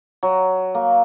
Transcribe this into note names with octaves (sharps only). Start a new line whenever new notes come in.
F#3
A#3